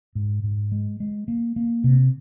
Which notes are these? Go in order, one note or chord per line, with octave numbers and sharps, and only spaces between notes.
G#2
G#2
G#3
G#3
A#3
A#3
C3